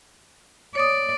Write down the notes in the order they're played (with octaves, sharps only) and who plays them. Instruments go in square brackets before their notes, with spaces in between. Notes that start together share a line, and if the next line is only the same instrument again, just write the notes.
[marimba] C#5 D#6 [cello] D5